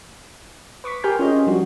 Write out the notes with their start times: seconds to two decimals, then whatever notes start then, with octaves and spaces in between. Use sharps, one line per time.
0.84 B4 C#6 D6 B6
1.04 G4 A#4 G#5 C6 F6 G6
1.19 C#4 F4 G#4 C#5 D#5
1.33 C#4
1.46 F3 G3 D4 F4 F#4